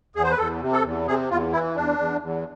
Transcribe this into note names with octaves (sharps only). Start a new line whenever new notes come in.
E2 G#4
C5
B4
E2 A4
C3
A4
E2
C3 G#4
E2 F4
E3 E4
E2 D4
E2
E2